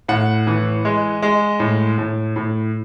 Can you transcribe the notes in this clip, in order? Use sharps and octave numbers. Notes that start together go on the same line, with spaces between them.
A2 F#5
E3
G#3
G#3
A2
A2
A2